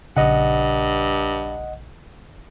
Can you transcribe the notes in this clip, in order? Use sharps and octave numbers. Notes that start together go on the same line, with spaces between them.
A#1 G2 C#3 D#5 F#5